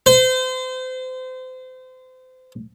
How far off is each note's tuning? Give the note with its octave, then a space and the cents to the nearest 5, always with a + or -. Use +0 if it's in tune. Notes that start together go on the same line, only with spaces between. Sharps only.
C5 -30